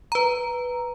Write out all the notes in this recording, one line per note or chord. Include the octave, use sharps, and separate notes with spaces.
B4 A#5